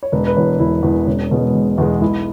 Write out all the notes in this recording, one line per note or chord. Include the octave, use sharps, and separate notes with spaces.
C#5
E1 B4
B4
E2 E3 C#5
E1 E4
E2 E3
E1 C#4
E2 B2 G#3
E1
E2 B2 G#3
B1 E4